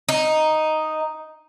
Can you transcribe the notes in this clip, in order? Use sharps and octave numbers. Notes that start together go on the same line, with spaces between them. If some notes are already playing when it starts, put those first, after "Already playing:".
D#4